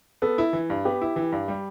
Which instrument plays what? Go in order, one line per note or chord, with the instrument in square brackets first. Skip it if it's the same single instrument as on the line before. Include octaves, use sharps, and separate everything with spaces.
[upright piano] B3 [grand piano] A4
[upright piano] E4
E3
G2
[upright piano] B3 [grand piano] G4
[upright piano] E4
E3
G2
G3